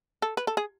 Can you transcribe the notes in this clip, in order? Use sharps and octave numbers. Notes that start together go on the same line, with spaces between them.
A4
B4
A4
G#4